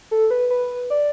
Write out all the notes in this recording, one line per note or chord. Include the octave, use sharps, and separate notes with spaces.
A4
B4
B4
D5